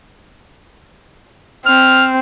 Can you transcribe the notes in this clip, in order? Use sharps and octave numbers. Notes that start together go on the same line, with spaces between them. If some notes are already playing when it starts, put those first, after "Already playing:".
C4 F6